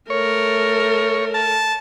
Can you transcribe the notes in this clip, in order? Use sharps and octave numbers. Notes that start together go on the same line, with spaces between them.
A3 A#4 C#5
A5